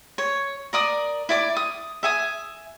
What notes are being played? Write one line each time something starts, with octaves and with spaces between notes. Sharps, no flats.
C#5
A#4 D5 D#6
E4 D5 D6
D#6
E5 G#5 D#6